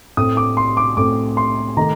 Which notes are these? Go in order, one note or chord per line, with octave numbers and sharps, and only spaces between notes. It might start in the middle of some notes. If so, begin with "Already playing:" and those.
A2 A3 C4 D#6
D6
C6
D6
A2 A3 C4 D6
C6
D#3 A3 A#5